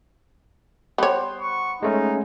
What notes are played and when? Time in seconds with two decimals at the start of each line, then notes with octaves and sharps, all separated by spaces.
0.98 G3 B3 C5 C#5
1.40 C#6
1.82 G#3 A3 C#4 D#4